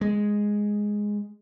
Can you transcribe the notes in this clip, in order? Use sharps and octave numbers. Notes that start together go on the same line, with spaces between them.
G#3